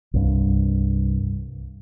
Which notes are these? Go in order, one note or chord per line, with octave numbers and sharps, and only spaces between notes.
C2 G2